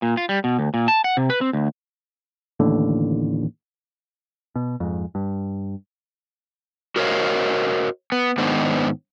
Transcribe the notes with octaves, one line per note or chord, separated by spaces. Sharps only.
A#2
F4
G3
B2
D2
A#2
A5
F#5
C3
B4
C4
D2
A1 D#2 A2 D3
B2
F2 G#2
G2
F#4 A#4 C5 C#5 D#5 F5
B3
G#2 D#3 B3 D4 C5